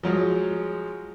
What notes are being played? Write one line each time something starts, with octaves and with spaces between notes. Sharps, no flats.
F3 F#3 G#3